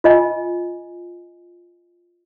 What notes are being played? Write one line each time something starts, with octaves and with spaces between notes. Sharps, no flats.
F4 D#5 G#5